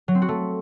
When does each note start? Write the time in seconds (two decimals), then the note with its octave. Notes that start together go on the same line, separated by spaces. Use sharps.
0.08 F#3
0.15 C4
0.22 F#4
0.29 A3